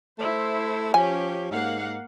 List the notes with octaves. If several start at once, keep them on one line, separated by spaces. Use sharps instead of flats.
A3 E4 C5
F3 C#4 G4 G#5
G#2 A#3 F5 F#5